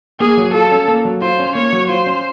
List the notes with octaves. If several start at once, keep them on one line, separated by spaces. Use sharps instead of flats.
A#3 G#4
F#3
F4 A4
C#4
A#3
F#3
F4 C5
C#4
A#3 C#5
F#3
F4 C5
C#4